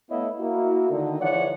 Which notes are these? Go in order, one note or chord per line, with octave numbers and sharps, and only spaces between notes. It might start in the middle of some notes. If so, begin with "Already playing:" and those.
A3 B3 E4 C#5 D#5 F5
A#3 E4 F#4
D3 D#3 D#4
E3 F3 G#3 C#5 D5 F#5